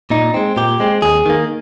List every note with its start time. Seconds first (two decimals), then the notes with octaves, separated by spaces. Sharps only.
0.10 A#2 D#4
0.34 G#3 C4
0.57 A#2 G4
0.80 G#3 C4
1.02 D#2 G#4
1.26 D#3 A#3